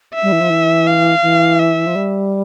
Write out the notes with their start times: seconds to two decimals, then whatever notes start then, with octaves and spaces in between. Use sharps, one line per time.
0.15 E5
0.23 G3
0.32 E3
0.41 F3
0.50 E3
0.87 F5
1.22 E3
1.59 E5
1.87 F3
1.95 G3